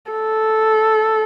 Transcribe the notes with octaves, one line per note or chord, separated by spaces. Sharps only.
A4